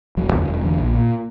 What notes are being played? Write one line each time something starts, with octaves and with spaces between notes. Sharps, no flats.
E1 F#3
E2 D3
E1
E2 D3
A#1
A#2